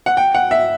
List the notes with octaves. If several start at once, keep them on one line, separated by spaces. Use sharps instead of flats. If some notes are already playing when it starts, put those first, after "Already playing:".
F#5
G5
F#5
E5